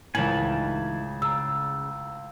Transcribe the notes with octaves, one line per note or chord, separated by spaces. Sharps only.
C#2 A2 D#3 E3 G#5 A5 F#7
C#3 A#5 E6